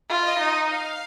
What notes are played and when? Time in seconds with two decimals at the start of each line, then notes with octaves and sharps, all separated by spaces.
0.09 F4
0.24 D#5
0.38 D#4
0.68 F5